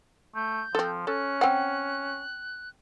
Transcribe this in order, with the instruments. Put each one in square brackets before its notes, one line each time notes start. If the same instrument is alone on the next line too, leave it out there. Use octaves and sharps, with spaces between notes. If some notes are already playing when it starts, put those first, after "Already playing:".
[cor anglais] A3 [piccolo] G6
[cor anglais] F3 [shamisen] C4 A4
[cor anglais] C#4 [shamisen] A4 [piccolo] F#6
[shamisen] C4 F#5 [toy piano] G5